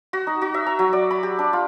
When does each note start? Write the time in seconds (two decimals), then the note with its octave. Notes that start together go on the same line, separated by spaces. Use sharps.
0.13 F#4
0.27 D#4
0.42 F#4
0.54 E5
0.66 A#5
0.79 F#3
0.93 D5
1.11 B5
1.23 G4
1.39 D4
1.53 F4